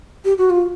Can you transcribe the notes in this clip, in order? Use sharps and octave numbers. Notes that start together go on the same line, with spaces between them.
G4
F#4
F4